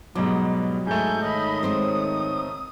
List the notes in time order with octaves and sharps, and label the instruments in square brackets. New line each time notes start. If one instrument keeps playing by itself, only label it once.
[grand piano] G#2 B2 D6 [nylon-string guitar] F#3 [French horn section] G3
[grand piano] G#2 A3 [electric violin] G#5 G6
[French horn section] D#3 C#5 [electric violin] D#5 B5
[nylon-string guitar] G#3 C4 C5 [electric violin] D#6